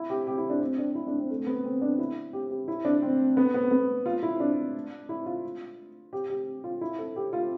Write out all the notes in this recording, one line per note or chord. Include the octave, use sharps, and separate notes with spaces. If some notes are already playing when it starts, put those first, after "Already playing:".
Already playing: E4
G4
G4
E4
D4
C4
D4
E4
D4
C4
A3
B3
C4
D4
E4
G4
G4
E4
D4
C4
B3
B3
B3
F4
E4
D4
E4
F4
G4
G4
F4
E4
A4
G4
F4